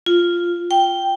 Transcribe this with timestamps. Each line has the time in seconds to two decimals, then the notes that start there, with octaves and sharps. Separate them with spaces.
0.06 F4
0.71 G5